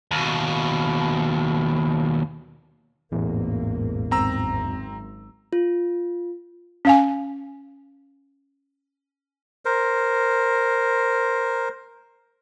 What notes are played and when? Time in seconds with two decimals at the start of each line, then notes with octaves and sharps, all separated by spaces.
0.11 D#2 B2
3.12 A1 E2 G#2 B2 A#3
4.11 G#1 F#2 C4 A#5 E6
5.53 F4
6.85 C#4 F5 G#5
9.65 A#4 C5